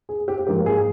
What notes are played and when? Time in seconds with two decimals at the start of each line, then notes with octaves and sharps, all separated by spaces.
0.09 G#4
0.28 G4
0.46 G#2 F3 A#3 D#4 G4
0.66 G#4